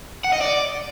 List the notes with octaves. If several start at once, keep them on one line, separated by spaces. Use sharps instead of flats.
F#5
D#5
D5